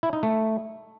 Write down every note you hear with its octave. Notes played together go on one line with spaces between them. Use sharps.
E4
D#4
A3